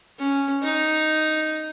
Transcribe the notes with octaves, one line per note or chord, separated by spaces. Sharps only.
C#4
D#4